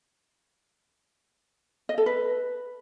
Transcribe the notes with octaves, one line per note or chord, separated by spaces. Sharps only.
D#5
A4
B4